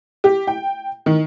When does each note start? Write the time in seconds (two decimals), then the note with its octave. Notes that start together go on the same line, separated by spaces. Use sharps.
0.24 G4
0.47 G5
1.06 D#3